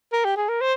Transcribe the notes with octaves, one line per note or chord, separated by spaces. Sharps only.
A#4
G4
G#4
A#4
C5